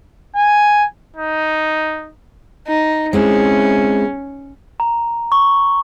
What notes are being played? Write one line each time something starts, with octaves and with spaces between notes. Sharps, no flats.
G#5
D#4
D#4
G#3 C4 C#4 E4
A#5
C#6